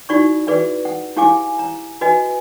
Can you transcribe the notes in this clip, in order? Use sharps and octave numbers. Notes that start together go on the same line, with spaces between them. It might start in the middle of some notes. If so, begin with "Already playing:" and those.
D#4 E4 F#4 D5 B5 C#6
F#4 G#4 B4 D5 E5
F#5
E4 G4 F5 G#5 D6
A#5
F#4 B4 D#5 G#5